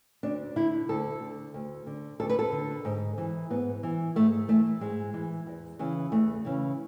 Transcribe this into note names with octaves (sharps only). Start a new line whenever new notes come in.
D2 D4
D3 E4
D2 A4
D3
D2
D3
D2 A4
B4
A4
D3
G#2
E3
G#2 B3
E3
G#2 A3
E3 A3
G#2 G#3
E3
E2
C#3 E3
E2 A3
C#3 E3